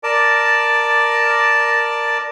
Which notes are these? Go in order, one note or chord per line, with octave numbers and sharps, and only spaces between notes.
A#4 D5 A5